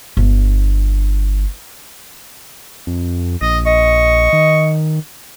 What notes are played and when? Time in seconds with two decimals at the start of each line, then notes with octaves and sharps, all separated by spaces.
0.17 G1 D4
2.87 F2
3.41 A#1 D#5
3.66 D#5 C#6
4.33 D#3